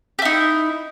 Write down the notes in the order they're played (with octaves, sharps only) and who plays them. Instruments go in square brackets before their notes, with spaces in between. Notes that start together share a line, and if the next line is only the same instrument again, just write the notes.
[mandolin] G4
E4
D#4